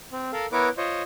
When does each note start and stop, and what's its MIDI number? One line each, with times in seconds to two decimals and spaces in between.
0.12 0.31 60
0.33 0.46 69
0.33 0.46 70
0.33 0.46 77
0.52 0.69 59
0.52 0.69 64
0.52 0.69 70
0.52 0.69 71
0.52 0.69 73
0.52 0.69 86
0.77 1.02 65
0.77 1.02 72
0.77 1.02 73
0.77 1.02 75